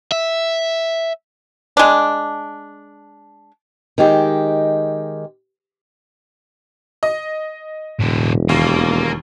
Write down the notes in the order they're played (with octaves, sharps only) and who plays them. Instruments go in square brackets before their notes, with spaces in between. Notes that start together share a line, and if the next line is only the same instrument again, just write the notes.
[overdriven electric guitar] E5
[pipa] G#3 D4
[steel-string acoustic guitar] D#3 G#3 G4
[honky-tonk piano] D#5
[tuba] E1 [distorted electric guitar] A2 D3
[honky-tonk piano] D#2 [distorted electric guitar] A#3